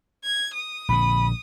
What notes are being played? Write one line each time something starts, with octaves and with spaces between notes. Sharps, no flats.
G#6
D#6
A#1 D3 B5